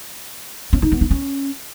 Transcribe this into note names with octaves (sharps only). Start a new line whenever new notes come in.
C#4
D#4
B3
D#4
C#4